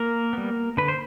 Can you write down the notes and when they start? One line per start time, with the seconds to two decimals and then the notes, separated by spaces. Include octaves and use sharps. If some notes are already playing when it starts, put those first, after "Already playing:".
Already playing: A#3 A#4
0.33 G3 B3
0.77 D3 B4
0.88 C5